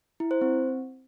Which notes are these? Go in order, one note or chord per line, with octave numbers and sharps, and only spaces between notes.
E4
C5
C4